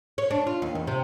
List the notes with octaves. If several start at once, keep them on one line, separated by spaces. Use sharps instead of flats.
C#5
D4
F4
D#2
E2
C3